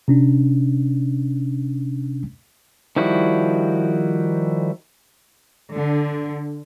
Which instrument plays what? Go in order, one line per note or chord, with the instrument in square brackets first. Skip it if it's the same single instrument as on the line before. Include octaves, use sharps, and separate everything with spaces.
[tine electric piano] C3 C#4 D4
[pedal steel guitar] D#3 F3 G3 E4 F#4
[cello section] D3